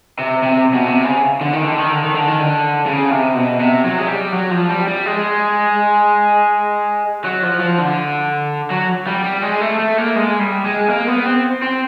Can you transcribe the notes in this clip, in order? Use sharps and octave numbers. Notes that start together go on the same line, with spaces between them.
C3
C3
B2
C3
C#3
D3
D#3
D3
D#3
D3
D#3
D3
D#3
D3
C#3
C3
B2
C3
F#3
G#3
G3
F#3
F3
G3
G3
G#3
F#3
F3
F3
D3
F#3
G3
G3
G#3
A3
A3
A#3
G#3
G3
G#3
A#3
B3
C4
C4